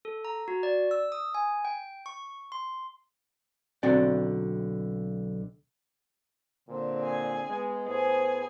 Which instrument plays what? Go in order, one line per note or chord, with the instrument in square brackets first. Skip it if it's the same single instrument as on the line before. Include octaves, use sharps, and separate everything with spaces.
[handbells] A4
A#5
F#4
D5
E6
D#6
G#5
G5
C#6
C6
[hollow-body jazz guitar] B1 D3 C4 F#4 D5
[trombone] A#2 [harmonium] D3 C4
[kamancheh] G#4 G#5
[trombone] G#3 [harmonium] B3
[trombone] A2 [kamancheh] G#4 G#5 [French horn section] C5